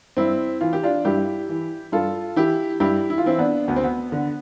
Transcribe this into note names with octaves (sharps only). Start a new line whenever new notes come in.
G2 C4 E4
E3 F4
G4
D4 F4
G2 E4 G4
E3
G2 F4 A4
E3 E4 G4
G2 E4 G4
E4
F4
E3 C4 E4
B3 D4
D2 B3
C4
B3
D3